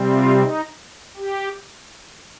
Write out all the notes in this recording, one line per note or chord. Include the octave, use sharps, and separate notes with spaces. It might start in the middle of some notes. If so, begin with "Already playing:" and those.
Already playing: C3 G3 C4
F4
D#4
G4